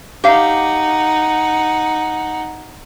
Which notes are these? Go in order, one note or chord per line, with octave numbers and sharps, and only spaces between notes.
D#4 G4 F5 F#5